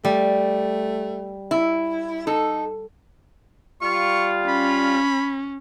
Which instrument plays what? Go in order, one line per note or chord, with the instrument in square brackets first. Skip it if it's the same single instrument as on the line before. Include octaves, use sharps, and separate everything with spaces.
[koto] G3 [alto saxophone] A3
[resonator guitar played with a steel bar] E4
[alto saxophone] D#4 [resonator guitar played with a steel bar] A4
[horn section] G3 F4 [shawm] C#6
[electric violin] C#4 [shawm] B5